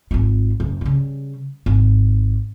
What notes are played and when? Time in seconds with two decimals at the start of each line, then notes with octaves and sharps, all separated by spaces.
0.11 G#1 F4
0.60 F#1
0.81 C#3 G3
1.66 G#1